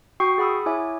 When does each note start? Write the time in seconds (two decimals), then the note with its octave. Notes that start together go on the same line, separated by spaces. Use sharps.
0.20 F#4 G5 C#6 D#6 C7
0.38 G#4 F#5 B5 D#6 E6
0.66 E4 C#5 E5 G#5 D6 D#6